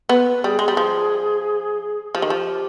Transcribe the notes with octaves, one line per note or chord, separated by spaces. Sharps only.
B3 B4
G3 G#4
G#3
G3
F3
F3 G4
D#3
F3